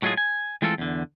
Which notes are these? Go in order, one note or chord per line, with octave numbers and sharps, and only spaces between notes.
A2 F#3 G#3 A3 F4 G#4
G#5
E3 G#3 A3 C4 F4 A4
E2 D3